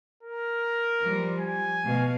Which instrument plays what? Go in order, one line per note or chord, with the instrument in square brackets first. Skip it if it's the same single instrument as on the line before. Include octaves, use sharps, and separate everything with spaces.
[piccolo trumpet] A#4
[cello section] F3 G3
[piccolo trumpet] G#5
[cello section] B2 F5